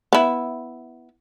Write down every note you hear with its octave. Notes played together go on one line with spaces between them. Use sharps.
B3 E4